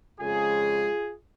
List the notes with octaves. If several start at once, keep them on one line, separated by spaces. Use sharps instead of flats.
F2 C#3 G#3 F4 G#4